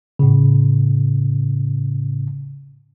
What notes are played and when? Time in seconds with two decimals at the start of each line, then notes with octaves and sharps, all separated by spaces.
0.19 A2 C#3